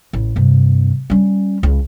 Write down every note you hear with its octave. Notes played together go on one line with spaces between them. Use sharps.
A1
G2 C3
G3 C#4
C#2